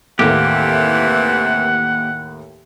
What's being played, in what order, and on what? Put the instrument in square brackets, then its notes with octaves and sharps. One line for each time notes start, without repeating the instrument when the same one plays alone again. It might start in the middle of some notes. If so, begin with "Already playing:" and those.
[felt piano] D#2 A2 [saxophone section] C3 E3 [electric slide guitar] A#3 G4 [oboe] F#5